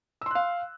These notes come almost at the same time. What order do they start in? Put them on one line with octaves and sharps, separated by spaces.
E6 C6 F#6 F5